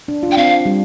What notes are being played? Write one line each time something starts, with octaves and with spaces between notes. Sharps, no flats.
D4
F4
D4 G5
C4 F5
G3